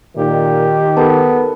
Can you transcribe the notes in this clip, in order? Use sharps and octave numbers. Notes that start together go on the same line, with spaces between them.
A#2 D#3 G4
B3 A4 A#4 A5